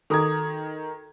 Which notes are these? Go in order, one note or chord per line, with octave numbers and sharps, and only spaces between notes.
D#3 F#4 G#4 A4 A#5 G#6